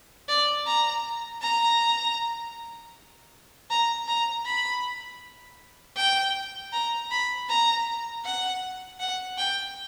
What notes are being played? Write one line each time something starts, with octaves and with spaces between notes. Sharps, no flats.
D5
A#5
A#5
A#5
A#5
B5
G5
A#5
B5
A#5
F#5
F#5
G5